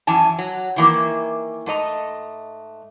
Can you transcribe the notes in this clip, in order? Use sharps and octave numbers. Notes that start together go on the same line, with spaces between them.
F#2 E3 G#5 A5
F#3
D#3 E3 A#3
G#2 A3 D#5 A#5